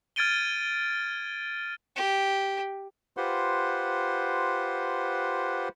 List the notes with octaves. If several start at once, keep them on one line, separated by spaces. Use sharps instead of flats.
F6 G#6 A6 D7 D#7 G7
G4
F4 G4 B4 C5 F#5 C6